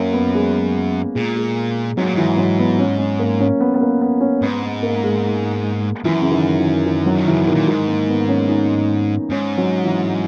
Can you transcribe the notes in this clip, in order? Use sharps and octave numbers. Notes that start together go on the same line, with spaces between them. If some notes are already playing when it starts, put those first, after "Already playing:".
Already playing: F#2 A#3 C#4
B3
G#3
A#2 G#3
G#3
G#2 F#3
A#2
G#2 E3
F#3
B3
C#4
C#4
A#3
C#4
B3
B3
A#3
B3
C#4
G#2 B3
B3
A#3
G#3
F#2 E3
C#3
D#3
E3
D#3
F#3
D#3
C#3 E3
B2
D#3
A#2
G#2 D#3
A#3
B3
C#4
D#4
G#2 C#4
F#3
E3